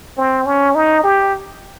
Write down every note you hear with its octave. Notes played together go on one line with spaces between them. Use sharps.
C4
C#4
D#4
G4